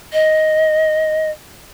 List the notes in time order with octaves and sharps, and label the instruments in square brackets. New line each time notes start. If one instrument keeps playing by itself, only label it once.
[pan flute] D#5